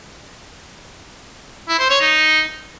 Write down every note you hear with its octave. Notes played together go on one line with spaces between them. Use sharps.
E4
C5
C#5
D#4